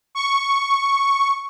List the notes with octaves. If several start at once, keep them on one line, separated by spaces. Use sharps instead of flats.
C#6